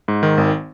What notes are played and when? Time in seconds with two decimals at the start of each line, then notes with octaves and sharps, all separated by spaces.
0.08 G#2
0.23 D#3
0.38 G#1